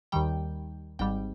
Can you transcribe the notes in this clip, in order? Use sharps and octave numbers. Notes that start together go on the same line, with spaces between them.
D#2 D#3 G3 G5
G#1 G#2 G3 G5